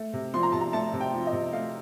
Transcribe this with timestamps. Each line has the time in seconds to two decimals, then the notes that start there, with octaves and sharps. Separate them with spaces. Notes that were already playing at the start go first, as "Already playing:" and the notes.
Already playing: A3
0.13 C3
0.34 F3 C6
0.43 A#5
0.52 C3 A5
0.61 A#5
0.73 A3 A5
0.93 C3
1.00 G5
1.14 F3
1.27 D#5
1.33 C3
1.53 A3 F5